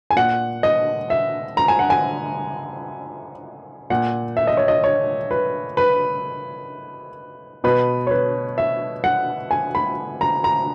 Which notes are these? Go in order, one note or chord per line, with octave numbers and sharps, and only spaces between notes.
G#5
A#2 F#5
D#5
E5
A#5
G#5
F#5
G#5
A#2 F#5
E5
D#5
C#5
D#5
C#5
B4
B4
B2 B4
C#5
B4
E5
F#5
G#5
B5
A#5
A#5